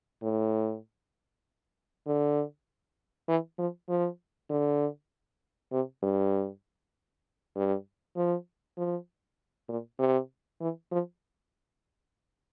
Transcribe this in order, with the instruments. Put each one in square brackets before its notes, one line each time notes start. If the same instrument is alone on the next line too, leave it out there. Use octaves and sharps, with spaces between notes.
[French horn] A2
D3
E3
F3
F3
D3
C3
G2
G2
F3
F3
A#2
C3
E3
F3